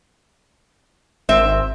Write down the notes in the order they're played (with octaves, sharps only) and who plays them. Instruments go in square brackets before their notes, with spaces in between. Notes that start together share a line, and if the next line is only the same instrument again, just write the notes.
[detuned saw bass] G#1 [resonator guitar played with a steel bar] C4 E5